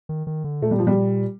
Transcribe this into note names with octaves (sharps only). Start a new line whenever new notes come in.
D#3
D#3
D3
A#2 A3
G3
F3
G3